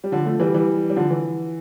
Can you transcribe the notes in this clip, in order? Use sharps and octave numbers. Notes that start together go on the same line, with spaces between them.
G3
D3 F3
F3 A3
E3 G3
E3 G3
G3
D3 F3
E3